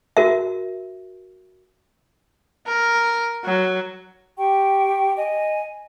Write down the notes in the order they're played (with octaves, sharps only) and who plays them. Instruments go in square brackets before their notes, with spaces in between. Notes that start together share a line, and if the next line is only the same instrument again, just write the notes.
[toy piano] F#4 A#4 E5
[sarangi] A#4
F#3
[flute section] G4 G5 C#6
D#5 G#5